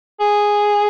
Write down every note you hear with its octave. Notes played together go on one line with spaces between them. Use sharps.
G#4